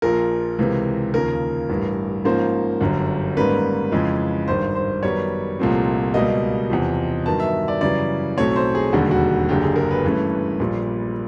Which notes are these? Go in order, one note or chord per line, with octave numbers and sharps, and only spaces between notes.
A#1 A#2 F3 A#4
C#2 C3 E3
D#2 C#3 F3 A#4
A1 G2 E3
G#2 F3 A#3 C#4 C5
G1 F#2 D3
G#2 D#3 G3 A#3 C#4 B4
F2 C#3 E3 G#3
G#1 G2 D#3 C5
C5
F#2 D#3 G3 B3 C#5
C2 A#2 F3 A3 C4
C#2 B2 G3 A#3 D#5
E2 C3 F3
G2 D#3 F#3 B3 A5
E5
D5
F#2 C#3 E3 G3 D5
B1 A2 F#3 A3 C4 C#5
C5
G#4
E1 D#2 D3 G3 F#4
F#4
F#1 F#2 D3 G4
G#4
A#4
B4
G2 E3 A3 C#4
A#1 A#2 G3